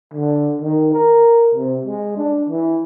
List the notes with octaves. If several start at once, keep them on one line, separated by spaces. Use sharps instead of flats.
D3
D#3
A#4
C3
G#3
D4
E3